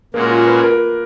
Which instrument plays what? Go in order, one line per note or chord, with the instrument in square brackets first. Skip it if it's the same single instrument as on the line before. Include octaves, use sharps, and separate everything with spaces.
[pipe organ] A#2 G#3 C#4 F#4 [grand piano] A#3
[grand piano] F4
B4
A#4